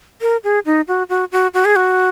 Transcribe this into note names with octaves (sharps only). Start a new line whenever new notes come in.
A#4
G#4
D#4
F#4
F#4
F#4
F#4
G#4
F#4